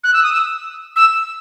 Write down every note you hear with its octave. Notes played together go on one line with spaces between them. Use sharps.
F#6
E6
D#6
E6
E6